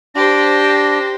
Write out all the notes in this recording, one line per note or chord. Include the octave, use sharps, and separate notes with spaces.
D4 G4 C5 A#6